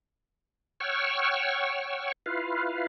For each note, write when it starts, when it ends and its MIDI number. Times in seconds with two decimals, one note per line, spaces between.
0.80 2.12 73
0.80 2.12 78
0.80 2.12 79
0.80 2.12 85
0.80 2.12 88
0.80 2.12 89
2.26 2.87 64
2.26 2.87 65
2.26 2.87 71
2.26 2.87 77